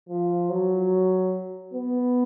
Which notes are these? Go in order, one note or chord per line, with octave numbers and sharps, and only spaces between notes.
F3
F#3
B3